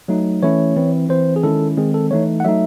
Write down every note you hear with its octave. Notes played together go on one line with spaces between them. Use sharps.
F#3 A3 D#4
E3 A3 C#4 E4 C#5
E3 C4 E4
E3 C4 E4 C5
G#4
D#3 G#3 C#4 E4 A4
D#3 G#3 C4 G#4
A4
E3 A3 D#4 C#5
F#5
F#3 A3 D#4 E5